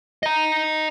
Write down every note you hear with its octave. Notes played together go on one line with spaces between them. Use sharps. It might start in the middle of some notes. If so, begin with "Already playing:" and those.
D#5 A#5